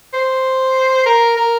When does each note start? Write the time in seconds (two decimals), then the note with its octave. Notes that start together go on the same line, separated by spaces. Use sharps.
0.13 C5
1.06 A#4
1.37 A#4